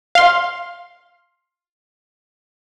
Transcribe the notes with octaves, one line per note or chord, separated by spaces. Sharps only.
F5 C6